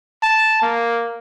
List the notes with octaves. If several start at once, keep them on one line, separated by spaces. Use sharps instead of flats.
A5
A#3